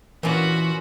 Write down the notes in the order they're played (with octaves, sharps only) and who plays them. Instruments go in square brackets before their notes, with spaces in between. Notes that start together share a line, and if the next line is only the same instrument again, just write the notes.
[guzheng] A#2 C#4 [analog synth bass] E3 [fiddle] F#4 B5